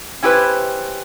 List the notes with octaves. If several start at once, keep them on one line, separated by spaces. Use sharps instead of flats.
C#4 E4 G4 G#4 B4 C5